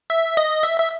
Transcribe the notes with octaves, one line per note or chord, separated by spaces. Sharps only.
E5
D#5
E5
E5